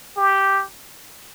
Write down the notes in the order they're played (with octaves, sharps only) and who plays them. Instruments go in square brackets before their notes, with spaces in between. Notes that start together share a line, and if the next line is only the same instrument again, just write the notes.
[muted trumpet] G4